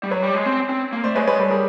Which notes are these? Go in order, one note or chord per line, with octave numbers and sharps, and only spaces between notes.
G3
F#3 B4 C#5
G3
G#3
C4
C4
A#3
A3 C5 D5
G#3 B4 C#5
G#3 B4 C#5
G3 A4 B4
G#4 A#4